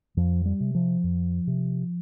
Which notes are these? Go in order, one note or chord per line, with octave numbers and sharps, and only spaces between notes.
F2 F3
G3
C3
F3
F2
C3